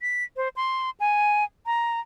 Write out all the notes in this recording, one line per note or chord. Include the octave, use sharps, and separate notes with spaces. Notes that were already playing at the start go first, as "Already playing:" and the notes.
B6
C5
C6
G#5
A#5